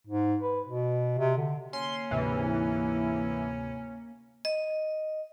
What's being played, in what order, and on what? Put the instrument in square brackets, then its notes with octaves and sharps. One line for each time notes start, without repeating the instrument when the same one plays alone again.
[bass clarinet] G#2
B4
B2
C3
D3
[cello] A#3 [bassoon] C#4 [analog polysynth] C6
[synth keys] D2 G#2 C3 [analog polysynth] E3
[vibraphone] D#5